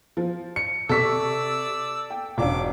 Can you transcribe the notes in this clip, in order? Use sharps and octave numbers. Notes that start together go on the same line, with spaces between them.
F3
C#7
C3 A4 D5 C#6 E6 B6
G5
E1 C#4 D4 F4 D6